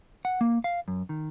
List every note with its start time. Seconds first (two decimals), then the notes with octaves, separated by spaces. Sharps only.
0.25 F#5
0.41 A#3
0.64 F5
0.88 F#2
1.09 D#3